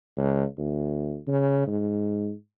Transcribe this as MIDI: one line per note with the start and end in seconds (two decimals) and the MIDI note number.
0.17 0.44 37
0.58 1.17 38
1.27 1.66 49
1.67 2.32 44